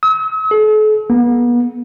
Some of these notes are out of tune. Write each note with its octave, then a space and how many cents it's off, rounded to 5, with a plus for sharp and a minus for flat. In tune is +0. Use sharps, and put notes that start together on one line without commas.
E6 -45
A4 -45
B3 -40